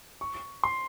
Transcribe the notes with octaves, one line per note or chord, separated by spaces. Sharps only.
C#6
C6